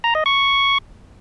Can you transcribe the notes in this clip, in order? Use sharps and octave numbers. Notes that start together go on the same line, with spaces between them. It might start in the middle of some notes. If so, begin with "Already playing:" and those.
A#5
D#5
C#6